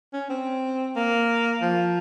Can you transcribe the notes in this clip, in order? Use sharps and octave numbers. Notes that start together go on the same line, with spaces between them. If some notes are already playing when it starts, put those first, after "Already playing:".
C#4
C4
A#3
F3